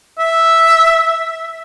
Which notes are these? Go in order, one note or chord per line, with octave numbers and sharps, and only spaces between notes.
E5